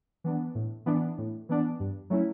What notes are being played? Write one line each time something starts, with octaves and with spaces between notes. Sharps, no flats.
E3 B3 D4
A2
E3 B3 D4
A2
E3 B3 D4
G2
F#3 A3 C#4 E4